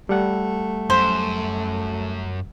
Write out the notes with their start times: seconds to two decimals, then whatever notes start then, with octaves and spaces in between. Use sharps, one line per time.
0.09 G3 A3 F#5
0.90 F#2 C5